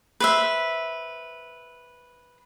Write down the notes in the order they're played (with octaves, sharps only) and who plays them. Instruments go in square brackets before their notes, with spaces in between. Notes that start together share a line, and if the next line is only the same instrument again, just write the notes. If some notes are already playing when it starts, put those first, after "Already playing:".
[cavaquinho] B4 C5 E5